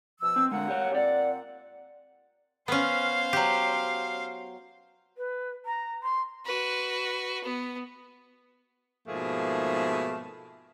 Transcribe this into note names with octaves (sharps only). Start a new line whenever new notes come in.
B2 F3 E6
C4
D3 G#3 A#4 F5 F#5
G4 C#5
A#2 C4 D5 F#5
B3 C#4 C5 F5
F#3 G4
B4
A#5
C6
F#4 B4
B3
G#2 B2 F3 A3 A#3 G#4